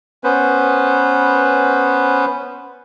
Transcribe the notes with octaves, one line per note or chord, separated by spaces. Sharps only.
B3 C#4 B4 C5